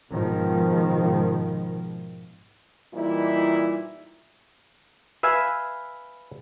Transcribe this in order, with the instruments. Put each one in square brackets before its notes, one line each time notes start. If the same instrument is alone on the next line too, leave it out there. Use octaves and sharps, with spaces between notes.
[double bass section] G#2 B2 D#3 F3
[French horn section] A#2 E3 G3 D#4 E4
[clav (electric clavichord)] B4 E5 F5 G#5